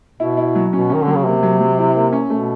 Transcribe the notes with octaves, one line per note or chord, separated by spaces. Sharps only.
B2 E4
E4
F#3
B2 C#4
D#3 C#4
D3 F#3
C#3
C3 A#3
F#3
F#3
E4
A#3
C#4
B2 A3